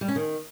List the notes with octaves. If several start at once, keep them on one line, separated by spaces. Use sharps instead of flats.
G3
C#4
D#3